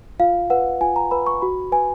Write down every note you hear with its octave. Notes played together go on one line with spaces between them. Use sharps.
F4 F5
B4 F#5
F4 G#5
A#5
B4 B5
C#6
F#4 B5
B4 G#5